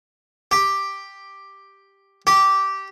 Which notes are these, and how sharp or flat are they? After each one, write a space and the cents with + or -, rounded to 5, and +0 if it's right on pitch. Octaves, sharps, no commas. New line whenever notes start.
G4 +0
G4 -15